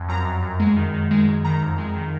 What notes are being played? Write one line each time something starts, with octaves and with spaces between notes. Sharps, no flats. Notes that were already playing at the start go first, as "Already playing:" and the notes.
Already playing: F2
F#2 A#5
F#2
F#2
G#3
D#3
D#3
G#3
F#2
D#3 A#5
F2
G#3
D#3